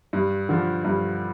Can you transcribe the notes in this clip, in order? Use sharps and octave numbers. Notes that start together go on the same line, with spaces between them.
G2
D3 F3
G2